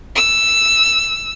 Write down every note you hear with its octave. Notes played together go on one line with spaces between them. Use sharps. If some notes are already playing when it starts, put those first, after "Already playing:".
E6